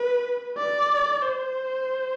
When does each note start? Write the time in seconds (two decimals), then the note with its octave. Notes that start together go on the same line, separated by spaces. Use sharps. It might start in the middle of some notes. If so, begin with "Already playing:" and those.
Already playing: B4
0.57 D5
1.23 C5